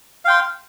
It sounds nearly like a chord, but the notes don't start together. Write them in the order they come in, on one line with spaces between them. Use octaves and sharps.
F5 G5 C6